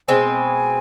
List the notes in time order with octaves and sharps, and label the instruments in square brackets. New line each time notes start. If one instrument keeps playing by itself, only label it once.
[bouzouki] B2 G#3 C4 [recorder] G#5